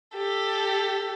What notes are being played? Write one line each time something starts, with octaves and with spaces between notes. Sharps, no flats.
G4 A4